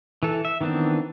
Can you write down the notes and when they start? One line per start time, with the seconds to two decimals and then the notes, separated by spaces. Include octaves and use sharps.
0.23 E3 A4
0.45 E5
0.61 D#3 E3 B3 C4 D4